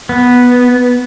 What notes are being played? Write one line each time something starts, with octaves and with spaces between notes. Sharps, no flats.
B3